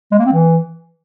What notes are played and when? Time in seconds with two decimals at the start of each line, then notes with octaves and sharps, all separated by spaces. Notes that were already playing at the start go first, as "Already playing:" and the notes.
0.12 G#3
0.19 A#3
0.26 C4
0.33 E3